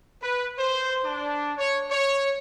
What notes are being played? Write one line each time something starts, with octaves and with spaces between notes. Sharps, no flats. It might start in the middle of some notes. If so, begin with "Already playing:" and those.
B4
C5
D4
C#5
C#5